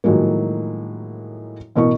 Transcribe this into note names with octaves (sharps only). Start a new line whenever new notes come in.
A2 D#3 F3 F#3 G#3 A#3
A1 B2 A#4 C#6